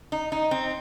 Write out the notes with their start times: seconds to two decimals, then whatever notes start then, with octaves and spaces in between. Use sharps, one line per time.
0.12 D#4
0.32 D#4
0.51 C4